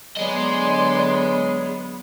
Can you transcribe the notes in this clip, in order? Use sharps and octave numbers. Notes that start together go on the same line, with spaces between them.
D3 F#3 B3 G#4 D5 D#5 C6